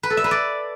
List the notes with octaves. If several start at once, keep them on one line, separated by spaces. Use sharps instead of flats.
B4
A4
E5
B4
D5